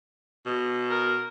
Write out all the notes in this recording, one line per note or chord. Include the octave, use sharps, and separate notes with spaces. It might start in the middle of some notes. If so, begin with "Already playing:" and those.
B2
A#4